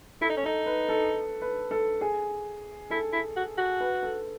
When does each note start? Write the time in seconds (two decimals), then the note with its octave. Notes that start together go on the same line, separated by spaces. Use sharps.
0.21 E4 A4
0.30 D#4
0.37 C#4
0.44 D#4 A4
0.66 B4
0.89 A4
1.42 B4
1.71 A4
2.01 G#4
2.90 E4 A4
3.13 E4
3.36 F#4
3.58 F#4
3.80 B4
4.03 A4